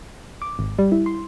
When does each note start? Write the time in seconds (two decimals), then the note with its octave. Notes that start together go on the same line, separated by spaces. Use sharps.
0.42 D6
0.59 G#1
0.79 G3
0.92 E4
1.06 C6